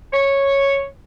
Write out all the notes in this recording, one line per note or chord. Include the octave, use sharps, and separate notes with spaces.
C#5